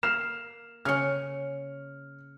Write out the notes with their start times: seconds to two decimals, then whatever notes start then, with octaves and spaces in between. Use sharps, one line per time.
0.03 A#3 F6 C7 E7
0.85 C#3 C#4 F6 C#7